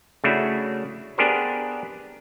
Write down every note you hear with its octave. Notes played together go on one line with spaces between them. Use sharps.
C#3 A3 D4 E4 F#4
B3 D4 G4 G#4 A#4 C5